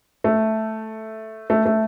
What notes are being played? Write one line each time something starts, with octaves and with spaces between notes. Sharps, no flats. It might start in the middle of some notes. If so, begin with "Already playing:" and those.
A3
A3
A3